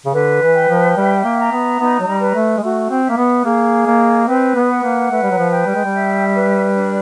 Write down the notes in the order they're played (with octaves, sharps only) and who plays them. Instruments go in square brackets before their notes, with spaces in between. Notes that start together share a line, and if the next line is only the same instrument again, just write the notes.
[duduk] C#3
[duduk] D3 [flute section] B4
[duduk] E3
[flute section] G5
[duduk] F3
[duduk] G3 [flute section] E5
[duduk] A#3
[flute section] A#5
[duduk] B3
[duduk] B3 [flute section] D#4
[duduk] F#3
G3
[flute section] B4
[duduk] A3
G#3
[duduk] A3 [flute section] F#4
[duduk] C4
[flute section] E5
[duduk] A#3
B3
[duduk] A#3 [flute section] G#4
[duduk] A#3 [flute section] D#5
[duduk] C4 [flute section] B4
[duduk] B3
[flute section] F#5
[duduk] A#3
[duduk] A3 [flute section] B4
[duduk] G3
F#3
F3
[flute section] G5
[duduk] G3
G#3
G3
[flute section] E5
B4
D4